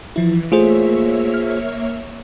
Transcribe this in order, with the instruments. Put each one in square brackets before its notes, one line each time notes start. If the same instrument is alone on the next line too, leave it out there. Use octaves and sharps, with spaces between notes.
[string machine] E3 [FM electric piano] F3 E4
[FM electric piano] A3 [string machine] A#3 C#5 E5 [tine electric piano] F4 G#4 C5
[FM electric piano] F6